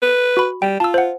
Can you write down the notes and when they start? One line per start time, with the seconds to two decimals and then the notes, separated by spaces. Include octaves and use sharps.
0.02 B4
0.37 F#4 B5
0.62 G3 G5
0.80 F4 A5 E6
0.94 C5 F#5